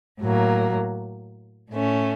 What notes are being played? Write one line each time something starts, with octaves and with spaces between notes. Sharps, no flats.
A2 F#3 A#3
A2 A3 C#4